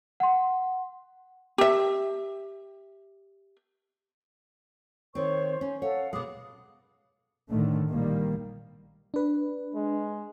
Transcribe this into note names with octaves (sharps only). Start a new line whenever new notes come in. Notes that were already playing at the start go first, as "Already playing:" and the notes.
F#5 C6
G4 E5
D#3 C4 C5 C#5 C#6
C#4
A4 C#5 F5 F#5
B2 G#3 D6 D#6
A2 D3 D#3 A3
A#1 A#2 D#3 G3 A#3
D4 B4
G#3